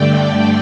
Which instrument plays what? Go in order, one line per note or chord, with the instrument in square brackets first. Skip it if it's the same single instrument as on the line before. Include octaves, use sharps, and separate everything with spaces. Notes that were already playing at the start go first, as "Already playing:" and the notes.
Already playing: [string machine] G2 D3 A3 D5 G5